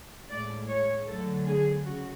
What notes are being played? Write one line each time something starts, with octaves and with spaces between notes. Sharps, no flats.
A2 G#3 D5
C#5
D3 F#3 A3 A4
G#4
C#3 F#4